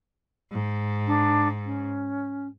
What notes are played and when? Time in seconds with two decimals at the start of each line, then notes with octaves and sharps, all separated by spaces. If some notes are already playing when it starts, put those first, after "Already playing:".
0.51 G#2
1.07 D4
1.65 C#4